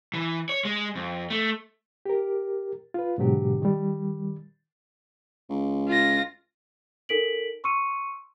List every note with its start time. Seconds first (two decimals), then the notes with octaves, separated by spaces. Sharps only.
0.13 E3
0.49 C#5
0.65 G#3
0.96 F2
1.30 A3
2.06 G4 A#4
2.94 F4 B4
3.18 G#2 B2 D3 F#3 G4
3.62 D#3 G3
5.50 C#2
5.88 F4 A#6
7.09 D#4 A4 A#4 B6 D7 F#7
7.64 C6 C#6 E6 C#7 D#7